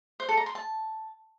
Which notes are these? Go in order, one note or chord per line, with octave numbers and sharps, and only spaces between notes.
C5
A4
A#5
C6
A5